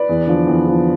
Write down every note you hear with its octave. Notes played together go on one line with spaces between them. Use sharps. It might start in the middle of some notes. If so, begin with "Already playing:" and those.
Already playing: B4 D5
E2
D3 F3
E2
D3 F3